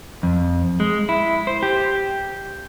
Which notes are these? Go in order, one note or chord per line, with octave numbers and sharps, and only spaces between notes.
F2
G#3
E4
C5
G4